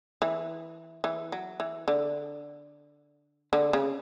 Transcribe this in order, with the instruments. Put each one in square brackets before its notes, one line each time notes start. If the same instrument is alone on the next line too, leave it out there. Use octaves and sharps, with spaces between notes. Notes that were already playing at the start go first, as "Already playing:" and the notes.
[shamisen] E3
E3
F#3
E3
D3
D3
C#3